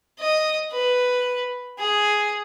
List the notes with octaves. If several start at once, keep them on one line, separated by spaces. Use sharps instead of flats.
D#5
B4
G#4